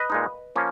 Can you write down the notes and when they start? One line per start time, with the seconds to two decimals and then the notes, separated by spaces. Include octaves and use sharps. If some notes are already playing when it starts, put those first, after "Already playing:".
Already playing: B4 D#5
0.10 A#2 G#3 D#4
0.56 F3 A#3 C#4